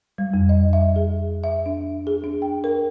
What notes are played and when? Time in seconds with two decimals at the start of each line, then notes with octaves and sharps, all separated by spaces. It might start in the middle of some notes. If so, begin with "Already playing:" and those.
0.18 G3
0.34 F2
0.49 D#5
0.73 E5
0.96 G#4
1.44 E5
1.66 D4
2.07 G#4
2.24 D4
2.42 G5
2.64 A#4